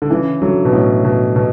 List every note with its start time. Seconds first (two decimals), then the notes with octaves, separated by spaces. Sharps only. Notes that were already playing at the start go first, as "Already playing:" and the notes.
0.02 D3
0.10 C#3 E3
0.42 D3 F#3
0.65 B2
0.73 A2
1.04 B2
1.36 B2